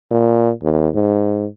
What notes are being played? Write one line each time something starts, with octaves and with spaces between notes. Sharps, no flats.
A#2
D#2
G#2